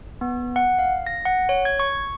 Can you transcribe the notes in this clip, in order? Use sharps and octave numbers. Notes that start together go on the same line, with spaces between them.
B3
F#5
F5
A#6
F#5
C#5
G#6
C#6